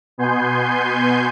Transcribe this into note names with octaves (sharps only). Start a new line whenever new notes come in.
B2 B3 G#5 C6 G6